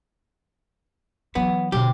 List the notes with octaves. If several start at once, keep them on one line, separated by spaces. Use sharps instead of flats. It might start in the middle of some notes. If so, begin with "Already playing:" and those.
E3 F#3 B3
B2 D3 G4